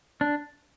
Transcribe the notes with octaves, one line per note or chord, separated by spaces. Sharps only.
D4